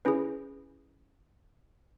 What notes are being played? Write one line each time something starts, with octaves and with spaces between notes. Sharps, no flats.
C#4 E4 G#4 B4